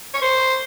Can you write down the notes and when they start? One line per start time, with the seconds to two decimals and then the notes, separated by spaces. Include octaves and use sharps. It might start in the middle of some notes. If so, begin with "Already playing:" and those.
0.14 C#5
0.22 C5